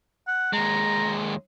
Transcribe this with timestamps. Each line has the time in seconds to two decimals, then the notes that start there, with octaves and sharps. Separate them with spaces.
0.28 F#5
0.53 D#2 G#3 A#5